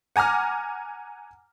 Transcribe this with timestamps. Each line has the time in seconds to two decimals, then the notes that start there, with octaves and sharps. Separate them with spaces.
0.16 F#5 G#5 A#5 D6 F6